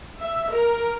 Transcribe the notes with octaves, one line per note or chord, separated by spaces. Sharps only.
E5
A#4